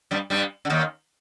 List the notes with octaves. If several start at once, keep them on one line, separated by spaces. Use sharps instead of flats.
G2 G3
G2 G3
D3
D#2 D#3